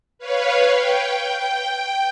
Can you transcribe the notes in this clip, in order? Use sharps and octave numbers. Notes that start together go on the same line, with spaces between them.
B4 C#5 F5
G5